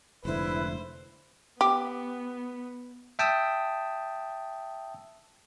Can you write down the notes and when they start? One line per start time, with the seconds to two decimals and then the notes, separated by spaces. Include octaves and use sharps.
0.25 F1 G#2 D3 E4 B4 C5
1.61 B3 G4
3.19 E5 G5 A5 D#6 E6